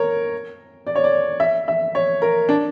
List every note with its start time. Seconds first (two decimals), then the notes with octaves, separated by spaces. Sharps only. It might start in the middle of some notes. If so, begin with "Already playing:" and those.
Already playing: A#4 C#5
0.87 D5
0.96 C#5
1.04 D5
1.40 E5
1.68 E5
1.95 C#5
2.22 A#4
2.49 D4